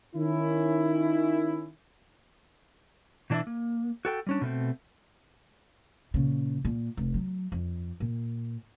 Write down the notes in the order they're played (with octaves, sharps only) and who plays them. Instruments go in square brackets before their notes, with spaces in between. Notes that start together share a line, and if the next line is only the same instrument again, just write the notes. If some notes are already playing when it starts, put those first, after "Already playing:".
[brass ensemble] D#3 C#4 E4
[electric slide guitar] B2 E3 D4 E4 D5 E5
A#3
F#4 A4 G5
G3 C#4 D4
B2 A3 C4
[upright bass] A#2 C#3
A#2
F1
F#3
F2
A#2